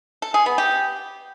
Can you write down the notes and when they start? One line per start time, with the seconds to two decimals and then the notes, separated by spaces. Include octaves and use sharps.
0.22 A4
0.34 G#4
0.46 B3
0.58 G4